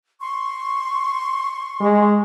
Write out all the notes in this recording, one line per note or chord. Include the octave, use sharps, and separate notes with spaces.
C6 C#6
G#3